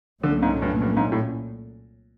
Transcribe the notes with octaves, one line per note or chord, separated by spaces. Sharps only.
C2 A#2 D3 F#3 A3 C#4
G#2
G2
G2
G#2
A2